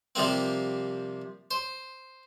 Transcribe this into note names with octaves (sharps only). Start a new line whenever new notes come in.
C3 F3 G3 A#3 C4
C5